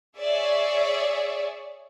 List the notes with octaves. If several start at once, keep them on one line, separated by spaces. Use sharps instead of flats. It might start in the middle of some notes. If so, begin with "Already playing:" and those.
G#4 C#5 D5 E5